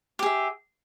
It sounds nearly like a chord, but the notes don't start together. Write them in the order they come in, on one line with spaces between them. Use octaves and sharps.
G4 G#4 E5